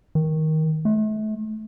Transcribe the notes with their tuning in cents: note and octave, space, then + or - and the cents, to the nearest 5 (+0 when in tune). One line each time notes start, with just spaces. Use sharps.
D#3 +15
A3 -35